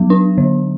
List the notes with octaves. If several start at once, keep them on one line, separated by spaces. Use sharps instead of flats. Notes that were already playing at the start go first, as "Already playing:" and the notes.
Already playing: F#3 B3
D4
D3